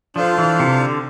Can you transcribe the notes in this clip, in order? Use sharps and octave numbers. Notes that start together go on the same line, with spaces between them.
F3 D4 F4 A4 C5 F5
E3
C3
D3